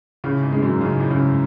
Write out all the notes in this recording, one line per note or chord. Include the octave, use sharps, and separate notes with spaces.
A2 C#3
G#2
G#3
F#2
G#2 C#3
A2
C#3
G#2